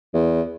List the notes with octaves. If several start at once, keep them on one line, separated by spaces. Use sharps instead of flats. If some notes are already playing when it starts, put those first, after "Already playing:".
E2